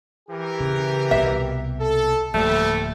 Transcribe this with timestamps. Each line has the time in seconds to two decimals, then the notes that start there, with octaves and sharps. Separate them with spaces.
0.29 E3 G4 A#4
0.60 C#3
1.11 C2 B2 E5
1.80 A4
2.34 D1 D2 F3 G3 A3 A#3